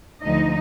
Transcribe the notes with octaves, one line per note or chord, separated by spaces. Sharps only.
D2 D3 F3 D#4 D#5